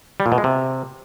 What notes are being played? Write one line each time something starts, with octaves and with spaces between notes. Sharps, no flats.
G3
A#2
B2
G#3
C3